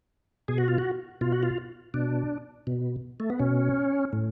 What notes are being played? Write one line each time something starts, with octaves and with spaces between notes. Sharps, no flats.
B2 G#4
F#4
F4
F#4
B2 F4
F#4
F4
B2 D4
B2
A3
B3
B2 C#4
A2